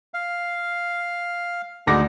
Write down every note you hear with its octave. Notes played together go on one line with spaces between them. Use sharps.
F5
D2 G#3 D#4 D6 A#6